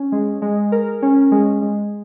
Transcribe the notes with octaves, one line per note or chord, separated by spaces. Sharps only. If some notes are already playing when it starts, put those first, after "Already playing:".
Already playing: C#4
G#3
G#3
A#4
C#4
G#3
G#3